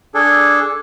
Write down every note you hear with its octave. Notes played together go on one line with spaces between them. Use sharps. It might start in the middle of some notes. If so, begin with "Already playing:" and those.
D4 G#4 A4